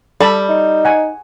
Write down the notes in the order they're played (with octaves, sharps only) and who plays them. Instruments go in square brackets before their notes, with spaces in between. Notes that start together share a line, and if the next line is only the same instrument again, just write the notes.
[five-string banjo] G3 [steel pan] A4 A5 B5
[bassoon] D#4
[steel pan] F#5 G#5